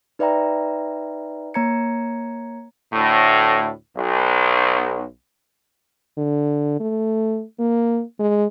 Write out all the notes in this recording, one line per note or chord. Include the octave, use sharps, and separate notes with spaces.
D#4 B4 D5 E5 G5 A#5
A#3 C#5 A#5 G#6 C#7
D2 A2
B1
D3
A3
A#3
G#3